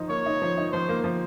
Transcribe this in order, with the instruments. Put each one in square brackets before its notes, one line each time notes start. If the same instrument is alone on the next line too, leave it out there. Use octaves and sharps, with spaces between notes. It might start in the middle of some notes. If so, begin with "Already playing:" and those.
Already playing: [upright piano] F3 D#4
[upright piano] A#3 [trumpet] C#5
[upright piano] D#4
F3
D#4
[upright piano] F3 [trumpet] C5
[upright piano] A#3
F3